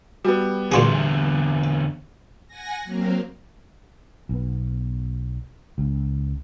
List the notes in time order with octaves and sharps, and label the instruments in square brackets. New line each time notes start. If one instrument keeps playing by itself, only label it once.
[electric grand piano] G3 B3 [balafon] F#4
[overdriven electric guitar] E2 D3 [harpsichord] A#2 F#4 G#4 [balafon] D4 C6
[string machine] F#5 G#5 A#6
F#3 A#3 C4 A#4
[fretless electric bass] B1 B3
C#2